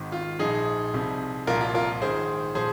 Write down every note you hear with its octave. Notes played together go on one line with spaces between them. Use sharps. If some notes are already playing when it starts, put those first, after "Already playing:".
Already playing: G#1 G#2 D#3
F4
A#1 A#2 F3 D#4 G#4
C2 C3 F3
C2 A#2 F3 F4 A#4
F4
F4 A#4
A#1 G#2 D#3 G#4 C5
A#2 F3 G#4 C5